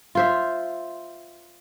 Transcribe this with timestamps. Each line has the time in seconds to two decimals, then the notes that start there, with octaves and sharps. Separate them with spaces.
0.15 F4 C5 E5